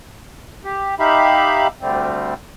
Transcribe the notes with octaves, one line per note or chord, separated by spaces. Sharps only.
G4
D#4 G4 E5 F5 B5
D2 D3 G3 A3 C4